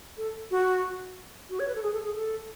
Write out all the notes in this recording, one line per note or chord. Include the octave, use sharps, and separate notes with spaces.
A4
F#4
F#4
C#5
B4
A4
G#4
A4
G#4
A4